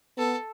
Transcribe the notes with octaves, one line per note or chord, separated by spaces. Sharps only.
B3 A4